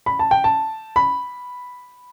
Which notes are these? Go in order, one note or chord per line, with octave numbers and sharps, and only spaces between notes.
B5
A5
G5
A5
B5